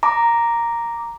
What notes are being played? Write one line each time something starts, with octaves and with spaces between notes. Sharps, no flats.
A#5 D6